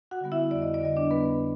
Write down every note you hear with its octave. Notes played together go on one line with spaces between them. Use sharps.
F#4 F#5
D3 G3 B3
E4 E5
F2 D5
D#5
D5
D3 G3 B3 D#5
D4 D5
F2 B3 B4